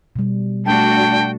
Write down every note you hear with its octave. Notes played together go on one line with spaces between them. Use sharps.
B2 G3
A3 D4 F#4 G5 A5